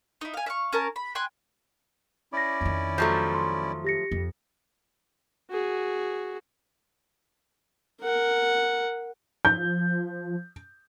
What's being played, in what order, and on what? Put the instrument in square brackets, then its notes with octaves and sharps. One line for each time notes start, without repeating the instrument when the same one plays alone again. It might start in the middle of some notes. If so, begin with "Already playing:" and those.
[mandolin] D#4 E4
F5 G#5
E5 F5 C#6
C#4 A#4 A5
B5
G5 G#5 C6 F#6
[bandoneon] C#4 E4 D5 [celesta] D6 A#6
[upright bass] F2 D#3
[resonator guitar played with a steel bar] F3 F#3 A3 [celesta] G6
[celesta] C6
G4 A#6 C#7
[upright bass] F2
[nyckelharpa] F#4 G#4
A#4 F#5
[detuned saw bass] F3 [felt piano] G6